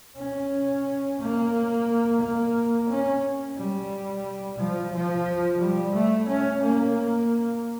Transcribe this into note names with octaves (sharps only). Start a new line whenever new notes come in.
C#4
A#3
A#3
C#4
G3
F3
F3
G3
A3
C#4
A#3